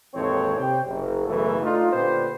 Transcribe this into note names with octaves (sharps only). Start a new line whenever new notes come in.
G#1 D#2 E3 C4 A4 C#5
C3 G4 C5 C#5 G5
F#1
F#1 B1 F#2 C#3 E3 A3
A3 D4 D#4 F4
A#2 D3 C#4 G4 B4 C5